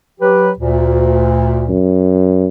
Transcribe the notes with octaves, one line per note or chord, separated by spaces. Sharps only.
F#3 G4 B4
D2 A#2
F#2